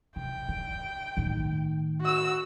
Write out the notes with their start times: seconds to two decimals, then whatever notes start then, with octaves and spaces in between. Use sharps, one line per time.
0.16 C3 G5
0.49 D3
1.17 A2 D#3
2.01 F#4 E6